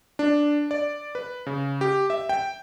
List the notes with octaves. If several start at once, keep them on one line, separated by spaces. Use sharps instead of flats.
D4
D5
B4
C#3
G4
E5
G5